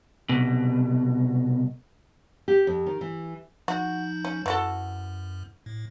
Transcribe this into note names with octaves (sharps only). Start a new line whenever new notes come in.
C2 B2
G4
F2
D#3
E3
F3 D#4 F#4 G6
C#4
F#2 E3 F#4 A4
A2